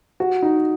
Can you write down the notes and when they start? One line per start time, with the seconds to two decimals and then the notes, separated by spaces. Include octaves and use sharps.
0.20 F#4
0.42 D#4